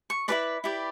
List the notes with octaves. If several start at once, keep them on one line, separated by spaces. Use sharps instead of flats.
C#6
E4 G4 B4 D5 B5
E4 G4 B4 D5